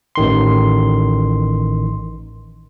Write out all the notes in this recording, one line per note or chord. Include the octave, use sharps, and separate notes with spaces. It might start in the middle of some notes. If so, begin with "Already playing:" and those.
A1 D#3 C6